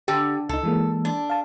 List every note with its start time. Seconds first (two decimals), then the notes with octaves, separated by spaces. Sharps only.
0.08 D3 G4
0.49 C#2 D#4 A4
0.63 E3 G#3 A#3
1.05 D4
1.30 F5 A5